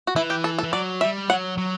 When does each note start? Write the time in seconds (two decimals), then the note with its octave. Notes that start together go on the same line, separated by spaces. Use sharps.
0.07 F#4
0.16 E3 E4
0.30 G4
0.44 A4
0.59 A4
0.63 E3
0.73 F#3 D5
1.01 G3 E5
1.30 F#3 F#5
1.58 F#3